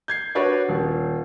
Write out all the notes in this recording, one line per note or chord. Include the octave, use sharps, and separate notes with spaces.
G6 G#6 C7
D4 F#4 B4 C#5 D5
D#1